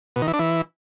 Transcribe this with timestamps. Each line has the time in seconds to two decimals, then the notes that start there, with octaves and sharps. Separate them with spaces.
0.16 B2
0.22 D#3
0.28 E3
0.33 D4
0.39 E3